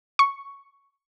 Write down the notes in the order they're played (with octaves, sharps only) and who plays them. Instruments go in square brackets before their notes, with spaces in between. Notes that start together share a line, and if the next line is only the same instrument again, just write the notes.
[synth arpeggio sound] C#6